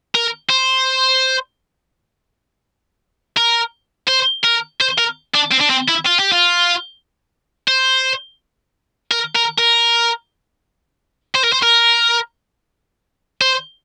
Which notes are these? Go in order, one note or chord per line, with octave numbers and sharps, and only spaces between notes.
A#4
C5
A#4
C5
A#4
C5
A#4
D4
C4
D4
C4
E4
F4
G4
F4
C5
A#4
A#4
A#4
C5
A#4
C5
A#4
C5